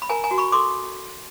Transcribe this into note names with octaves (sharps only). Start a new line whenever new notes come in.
B5
A#4 G#5 A#5
G#5 A#5
F#4
B5 C#6
A4 C6 D6